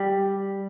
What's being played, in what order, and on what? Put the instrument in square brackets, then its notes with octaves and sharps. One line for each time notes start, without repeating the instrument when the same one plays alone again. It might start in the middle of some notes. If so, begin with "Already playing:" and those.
Already playing: [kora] G3